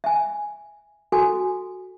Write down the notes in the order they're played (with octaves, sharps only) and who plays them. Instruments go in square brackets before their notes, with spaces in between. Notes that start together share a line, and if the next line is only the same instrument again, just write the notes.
[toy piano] E5 G#5
F#4 A4 G#5